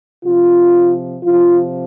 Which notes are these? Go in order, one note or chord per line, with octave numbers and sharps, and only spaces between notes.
C3 F3 F4
C3 F3 F4